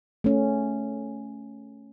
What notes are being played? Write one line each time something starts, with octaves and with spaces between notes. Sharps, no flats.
A3 C#4